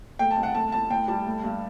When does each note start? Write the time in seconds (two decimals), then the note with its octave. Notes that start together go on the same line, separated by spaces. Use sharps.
0.19 A3 G5
0.31 A5
0.37 C2
0.43 F#5
0.55 A3 A5
0.72 A2 A5
0.90 A2 G5
1.08 G3 A5
1.26 A3
1.44 G2